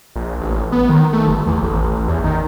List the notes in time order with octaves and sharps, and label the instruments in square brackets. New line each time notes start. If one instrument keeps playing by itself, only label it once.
[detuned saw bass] A#1
A1
B3
D#3
A3
G1
E2
A1
E2
D#3